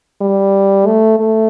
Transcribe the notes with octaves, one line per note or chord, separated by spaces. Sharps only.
G3
A3
A3